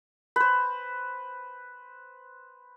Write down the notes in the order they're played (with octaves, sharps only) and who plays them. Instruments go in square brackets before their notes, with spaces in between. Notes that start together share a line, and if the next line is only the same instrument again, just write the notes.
[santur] B4 C5